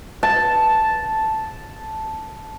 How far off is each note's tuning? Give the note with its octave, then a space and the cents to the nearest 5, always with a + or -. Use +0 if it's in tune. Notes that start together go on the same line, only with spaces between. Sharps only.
A5 -5